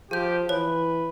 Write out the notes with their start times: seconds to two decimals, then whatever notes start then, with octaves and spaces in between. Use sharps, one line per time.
0.11 F3 G4 G#4 G6
0.49 E3 B4 C#5